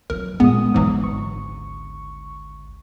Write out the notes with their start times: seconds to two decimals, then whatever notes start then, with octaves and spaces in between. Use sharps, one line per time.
0.10 F2 F#3 A#4
0.40 A#2 G3 G#3 B3 D#6
0.74 G#1 D2 G#2 E3 F#3
1.04 C#6